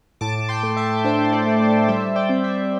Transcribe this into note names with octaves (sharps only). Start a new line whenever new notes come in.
A2 A5 D6
G5 C6
A3
E5 A5
D4 C5 E5
A4 D5
A3
C5
G3 C5 E5
D5 G5
C4
C5 E5